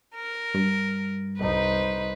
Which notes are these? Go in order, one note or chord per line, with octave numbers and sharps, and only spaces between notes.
A#4
G2
C2 D#4 B4 C5